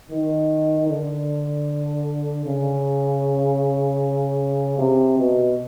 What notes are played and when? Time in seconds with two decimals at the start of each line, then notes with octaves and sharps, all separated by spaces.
0.10 D#3
0.89 D3
2.45 C#3
4.79 C3
5.18 B2